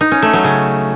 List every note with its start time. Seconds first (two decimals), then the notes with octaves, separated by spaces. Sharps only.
0.01 D#4
0.12 C#4
0.22 A3
0.33 F#3
0.44 C#3